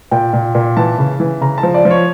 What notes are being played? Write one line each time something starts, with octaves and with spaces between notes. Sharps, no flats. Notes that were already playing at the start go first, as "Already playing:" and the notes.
A#2 G5
A#2
A#2
E3 A5
C#3
E3
C#3 A#5
A5
F3
D5
F3
C#5